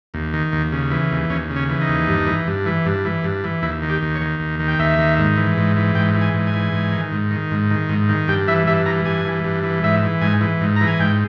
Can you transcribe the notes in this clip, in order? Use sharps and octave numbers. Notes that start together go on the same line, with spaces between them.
D#2
D#3
D#2
C#3
E3
D#2
D#2 C#4
C#3
C#4
E3
D#4
D#2
G2
E3
G2
E3
G2
E3
G2
E3
D#2 E4
D#3
G4
D#2
C#5
D#3
D#2
D#3
G5
D#2 E5
D#3
G#2
E3
G#2
E3
G#2 G5
E3
G#5
G#2
G#5
E3
G#2
D#3
G#2
D#3
G#2
D#3
G#2
D#3
G2 G5
E3 E5
G2 E5
E3 A#5
G2 G#5
E3
G2
E3
G#2 E5
E3
G#2 G#5
E3
G#2
E3 A#5
G#5
G#2 G5